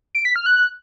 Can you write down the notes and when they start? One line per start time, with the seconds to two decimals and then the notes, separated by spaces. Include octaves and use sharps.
0.15 D7
0.25 B6
0.36 F6
0.46 F#6